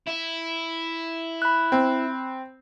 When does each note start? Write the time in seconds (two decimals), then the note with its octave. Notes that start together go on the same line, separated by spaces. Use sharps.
0.07 E4
1.42 B5 F#6
1.72 C4